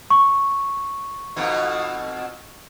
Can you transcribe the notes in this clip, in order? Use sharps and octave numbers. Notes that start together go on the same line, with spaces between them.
C#6
F2 B2 D#4